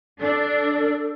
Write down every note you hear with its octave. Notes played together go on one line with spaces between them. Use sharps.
D4 A4